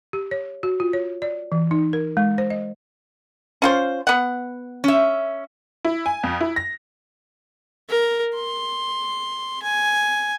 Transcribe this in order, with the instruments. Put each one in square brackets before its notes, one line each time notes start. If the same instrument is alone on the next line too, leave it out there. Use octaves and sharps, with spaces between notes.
[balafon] G4
C#5
F#4
F4
C#5
D5
E3
D#4
A#4
G#3
C5
D#5
[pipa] C#4 F4 C5
B3 F#5
[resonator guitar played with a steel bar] C#4 E5
[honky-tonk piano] E4
G#5
F2
E4
A#6
[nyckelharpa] A#4
C6
G#5